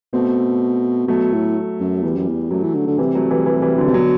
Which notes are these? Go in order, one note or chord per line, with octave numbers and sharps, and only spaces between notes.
B2 A3 C4
B2 F#3 A3
A2
F#2
F#3
E2 E3 G3
F#2
E2
F#2 F#3 A3
E3
D3
D3
C3 E3 G3
F#3 A3
E3 G3
E3 G3
E3 G3
D3 F#3
C3
B2 D3 F#3